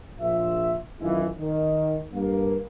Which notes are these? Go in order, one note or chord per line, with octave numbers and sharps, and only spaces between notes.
A#1 F4 E5
F#2 D#3 E3 G#3 E4 F4
D#3
G2 A#3